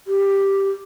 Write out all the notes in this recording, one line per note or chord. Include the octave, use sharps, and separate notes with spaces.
G4